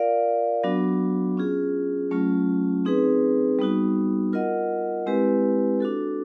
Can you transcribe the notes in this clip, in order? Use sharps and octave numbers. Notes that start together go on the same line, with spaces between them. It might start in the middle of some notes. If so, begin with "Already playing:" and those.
Already playing: F4 A#4 D5 F5
F#3 B3 D4 F#4
C#4 F4 G#4
F#3 A3 C#4 F4
C4 D#4 G#4 B4
G3 B3 D#4 F#4
F4 A#4 D#5 F#5
G#3 C4 E4 G4 B4
D4 F#4 A4